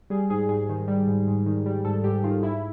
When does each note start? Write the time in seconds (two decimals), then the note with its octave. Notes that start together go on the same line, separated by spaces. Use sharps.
0.10 G3 G#4
0.30 G#2 G#4
0.49 G#2 G#4
0.69 D#3
0.88 G3
1.08 G#2
1.27 G#2
1.46 D#3
1.66 G3
1.85 G#2 A4
2.04 G#2 G4
2.24 D#3 F4
2.43 G#2 E4